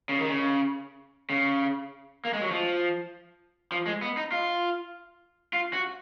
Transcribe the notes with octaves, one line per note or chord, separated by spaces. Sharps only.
C#3
D#3
C#3
C#3
A#3
G#3
F#3
F3
F3
G#3
B3
D#4
F4
F4
F#4